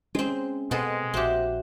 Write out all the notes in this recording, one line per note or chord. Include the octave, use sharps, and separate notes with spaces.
G#3 C4 C#4
B2 G#3 B3 C4 A4
A#1 C4 F#4 G4 E5 F#5